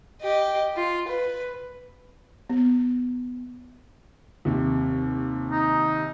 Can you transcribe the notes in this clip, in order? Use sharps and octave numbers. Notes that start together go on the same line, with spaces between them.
G4 D#5
F4
B4
B3
D#2 C3
D#4